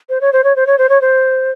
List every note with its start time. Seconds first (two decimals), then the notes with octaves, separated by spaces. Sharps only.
0.09 C5
0.21 C#5
0.33 C5
0.44 C#5
0.56 C5
0.67 C#5
0.78 C5
0.89 C#5
1.01 C5